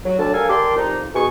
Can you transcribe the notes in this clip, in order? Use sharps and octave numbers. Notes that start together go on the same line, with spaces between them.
F#3
D2 D5 A5
G4 A4 A#4 F5 G#5
G4 A#4 D5 A5 C6 D6
F2 D#4
B2 G#4 G#5 C#6